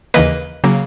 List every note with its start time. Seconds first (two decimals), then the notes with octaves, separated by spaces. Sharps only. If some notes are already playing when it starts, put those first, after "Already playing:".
0.14 D#2 C#3 E3 A#3 B4 D#5
0.64 C#3 F#3 A#3